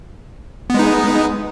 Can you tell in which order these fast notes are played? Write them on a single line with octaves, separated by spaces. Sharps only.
B3 G#3 D#4